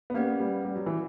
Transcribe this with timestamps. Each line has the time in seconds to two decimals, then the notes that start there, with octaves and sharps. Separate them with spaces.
0.10 B3
0.14 A#3 C#4 G4 B4 D5 F#5
0.40 G3
0.65 G3
0.76 F#3
0.86 E3